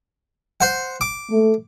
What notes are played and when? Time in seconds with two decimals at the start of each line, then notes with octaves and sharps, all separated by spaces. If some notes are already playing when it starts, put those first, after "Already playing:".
0.61 C5 F#5
1.01 D6
1.31 A3